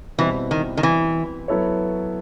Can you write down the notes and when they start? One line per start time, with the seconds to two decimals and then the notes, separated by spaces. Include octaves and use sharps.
0.18 B2 E3 G3 C4 E4
0.51 D#3
0.77 D#3
0.83 E3
1.48 F#3 B3 E4 A4 C#5